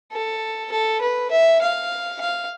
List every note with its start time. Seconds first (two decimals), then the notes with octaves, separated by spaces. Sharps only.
0.13 A4
0.72 A4
1.02 B4
1.32 E5
1.62 F5
2.21 F5